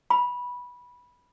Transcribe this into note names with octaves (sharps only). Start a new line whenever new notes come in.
B5